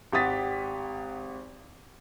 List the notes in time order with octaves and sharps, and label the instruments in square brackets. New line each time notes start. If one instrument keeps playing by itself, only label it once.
[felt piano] G#1 G4 F#5 D#6 A6 B6